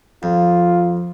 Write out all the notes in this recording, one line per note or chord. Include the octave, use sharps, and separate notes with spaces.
F2 F4